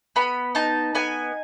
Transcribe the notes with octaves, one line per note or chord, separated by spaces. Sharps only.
B3 B5
D#4 A5
B3 G#5